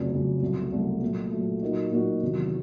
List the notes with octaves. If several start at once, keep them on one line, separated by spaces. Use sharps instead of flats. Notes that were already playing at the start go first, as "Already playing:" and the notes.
Already playing: F1 F2 C#3 F#3
F1 F2 C#3 F#3
C2 B2 F#3 A3
C2 B2 F#3 A3
A#2 F#3 A3
A#2 F#3 A3
A#2 F#3 A#3 D#4 F#4
A#2 F#3 A#3 D#4 F#4
E2 C3 D#3 F#3